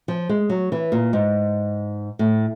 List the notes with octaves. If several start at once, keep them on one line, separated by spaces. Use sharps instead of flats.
F3
G#3
F#3
E3
A#2
G#2
A2